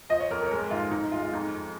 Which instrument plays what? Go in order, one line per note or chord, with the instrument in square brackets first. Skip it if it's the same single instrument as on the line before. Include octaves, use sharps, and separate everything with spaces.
[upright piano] F3 D#5
C#5
F2 A#4
A#4
C#5
G#3 A#4
G#2 F4
G#2 D#4
D#4
G#3 F4
F4
F2 D#4
F2